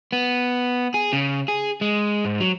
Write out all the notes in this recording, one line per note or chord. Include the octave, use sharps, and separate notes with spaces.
B3
G#4
C#3
G#4
G#3
G#2
F#3